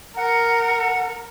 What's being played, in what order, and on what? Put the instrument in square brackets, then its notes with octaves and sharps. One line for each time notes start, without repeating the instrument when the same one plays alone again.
[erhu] A#4 [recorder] F#5